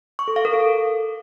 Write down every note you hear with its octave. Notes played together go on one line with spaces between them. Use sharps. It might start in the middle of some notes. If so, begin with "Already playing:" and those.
C#6
A4
F5
A#4
A4